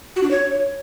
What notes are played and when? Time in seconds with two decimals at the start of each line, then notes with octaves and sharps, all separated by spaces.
0.16 F#4
0.23 D4
0.31 C#5